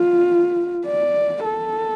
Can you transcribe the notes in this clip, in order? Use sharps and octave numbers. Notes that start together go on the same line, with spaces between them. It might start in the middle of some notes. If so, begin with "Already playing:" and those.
Already playing: F4
D5
A4